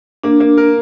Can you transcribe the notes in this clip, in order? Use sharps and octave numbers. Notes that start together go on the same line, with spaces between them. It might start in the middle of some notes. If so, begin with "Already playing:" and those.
A#3 D4
A#3
A#4